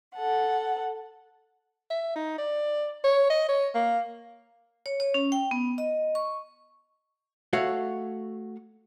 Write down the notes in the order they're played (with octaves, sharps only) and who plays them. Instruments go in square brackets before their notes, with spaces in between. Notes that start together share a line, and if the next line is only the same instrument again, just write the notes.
[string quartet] A4 F#5
[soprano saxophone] E5
D#4
D5
C#5
D#5
C#5
A#3
[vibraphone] C#5
C#5
C#4
G5
B3
D#5
C#6
[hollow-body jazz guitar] A3 F#4 C#5 F5